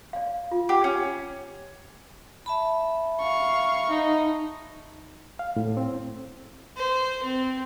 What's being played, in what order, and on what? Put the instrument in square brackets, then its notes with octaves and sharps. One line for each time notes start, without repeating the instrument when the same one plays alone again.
[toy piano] D5 F5
F4
[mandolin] G4 [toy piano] F#5
[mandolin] C#4
[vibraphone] E5 A5 B5
[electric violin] F5 C#6
D#4
[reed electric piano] F5
A2
C4
[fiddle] C5
C4